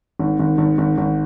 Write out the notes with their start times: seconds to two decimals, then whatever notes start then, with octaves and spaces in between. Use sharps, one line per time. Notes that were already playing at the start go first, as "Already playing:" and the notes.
0.19 G#1
0.40 G#1
0.58 G#1
0.78 G#1
0.98 G#1